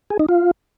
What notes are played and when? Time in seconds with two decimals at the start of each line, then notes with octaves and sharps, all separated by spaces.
0.10 G#4
0.19 D#4
0.29 F4